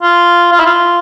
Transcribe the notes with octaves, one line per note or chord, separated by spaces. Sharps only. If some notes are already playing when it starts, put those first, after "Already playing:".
F4
F4
E4
F4